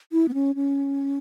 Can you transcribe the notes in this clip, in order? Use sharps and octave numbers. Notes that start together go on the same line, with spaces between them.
E4
B3
C#4
C#4